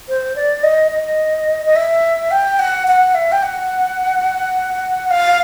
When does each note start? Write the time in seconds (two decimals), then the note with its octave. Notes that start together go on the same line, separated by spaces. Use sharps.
0.09 C5
0.36 D5
0.63 D#5
0.91 D#5
1.66 D#5
1.76 E5
2.31 G5
2.59 F#5
2.87 F#5
3.15 E5
3.32 G5
3.43 F#5
5.11 F5